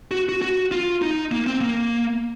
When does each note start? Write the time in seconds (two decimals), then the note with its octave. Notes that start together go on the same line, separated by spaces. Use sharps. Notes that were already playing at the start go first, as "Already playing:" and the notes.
0.11 F#4
0.29 F#4
0.42 F#4
0.72 F4
1.02 D#4
1.31 A#3
1.46 C4
1.61 A#3